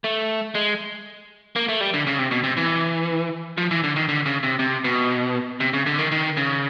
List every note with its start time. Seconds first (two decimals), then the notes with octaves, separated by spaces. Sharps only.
0.04 A3
0.55 G#3
1.56 A#3
1.69 A3
1.81 G3
1.94 D3
2.07 C#3
2.19 C3
2.31 B2
2.44 C3
2.57 E3
3.58 F3
3.71 E3
3.84 D3
3.96 D#3
4.09 D3
4.26 C#3
4.43 C3
4.59 C3
4.84 B2
5.60 C3
5.73 C#3
5.86 D3
5.98 D#3
6.12 D#3
6.37 C#3